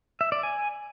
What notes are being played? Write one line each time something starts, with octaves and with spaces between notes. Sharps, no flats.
E5
D5
G#5